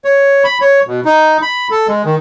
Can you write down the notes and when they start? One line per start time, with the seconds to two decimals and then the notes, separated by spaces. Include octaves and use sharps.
0.05 C#5
0.44 B5
0.61 C#5
0.87 B2
1.05 D#4
1.42 B5
1.71 A4
1.88 G#3
2.05 D#3